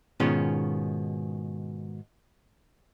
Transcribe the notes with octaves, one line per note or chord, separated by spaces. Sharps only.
G#2 B2 D#3 C#4 F4 G#4